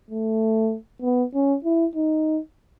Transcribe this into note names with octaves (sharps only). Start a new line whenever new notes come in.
A3
B3
C#4
E4
D#4